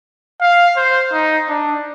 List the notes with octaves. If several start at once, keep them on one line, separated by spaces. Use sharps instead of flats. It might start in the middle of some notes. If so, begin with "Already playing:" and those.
F5
C5
D#4
D4